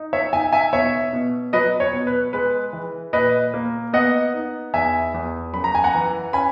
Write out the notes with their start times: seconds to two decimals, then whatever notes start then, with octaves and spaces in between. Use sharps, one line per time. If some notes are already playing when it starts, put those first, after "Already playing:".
Already playing: D#4
0.13 C#5 E5
0.33 D#4 E5 G#5
0.53 E5 G#5
0.73 B2 C#5 E5
1.13 B2
1.53 F#3 B4 D#5
1.80 C#5
1.93 B2
2.07 B4
2.33 G#3 B4
2.73 E3
3.13 A#2 B4 D#5
3.54 A#3
3.93 B3 D#5 F#5
4.34 D#4
4.74 E2 E5 G#5
5.14 E2
5.53 F#2 B5
5.64 A#5
5.75 G#5
5.84 F#5 A#5
5.94 E3
6.33 C#4 G#5 B5